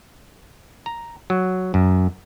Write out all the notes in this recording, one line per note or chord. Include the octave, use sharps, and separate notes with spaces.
A#5
F#3
F#2